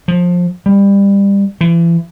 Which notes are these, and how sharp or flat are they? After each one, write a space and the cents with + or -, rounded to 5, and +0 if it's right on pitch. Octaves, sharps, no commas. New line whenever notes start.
F3 +20
G3 +25
E3 +35